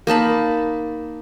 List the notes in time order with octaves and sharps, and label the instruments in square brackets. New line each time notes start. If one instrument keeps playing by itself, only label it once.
[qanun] A#3 D#4 A5 B5